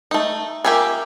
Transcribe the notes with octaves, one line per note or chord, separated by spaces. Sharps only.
A3 D#4
A#3 F4 G4 E5 G#5